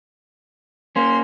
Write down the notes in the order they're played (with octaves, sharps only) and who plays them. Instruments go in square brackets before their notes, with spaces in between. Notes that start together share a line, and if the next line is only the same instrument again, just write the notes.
[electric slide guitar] A#3 C#4 [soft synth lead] C6